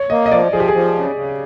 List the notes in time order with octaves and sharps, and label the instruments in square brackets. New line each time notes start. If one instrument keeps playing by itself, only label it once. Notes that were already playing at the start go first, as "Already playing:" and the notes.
Already playing: [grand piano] C#5
[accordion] A#3 [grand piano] D#5
[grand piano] D#5
[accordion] F3 [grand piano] D5
[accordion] F3 [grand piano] G#4
[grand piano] G4
G#4
[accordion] F3
C#3
C#3